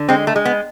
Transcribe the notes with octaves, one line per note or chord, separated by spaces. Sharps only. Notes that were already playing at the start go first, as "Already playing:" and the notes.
Already playing: D3
G#3 C4
A3
G#3
B3